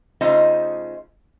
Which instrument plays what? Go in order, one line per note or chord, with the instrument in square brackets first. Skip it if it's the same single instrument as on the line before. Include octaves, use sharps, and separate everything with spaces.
[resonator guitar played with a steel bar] C#3 A3 D#4 F4 C5 D#5